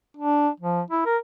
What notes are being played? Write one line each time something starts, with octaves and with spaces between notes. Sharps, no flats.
D4
F3
E4
A#4